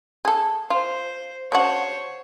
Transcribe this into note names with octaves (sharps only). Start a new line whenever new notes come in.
G#4 A4
F4 C5
C#3 D4 F#4 C5 C#5